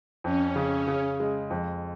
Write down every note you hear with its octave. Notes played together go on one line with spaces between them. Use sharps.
F2 C#4
C#3
C#3
G#3
F2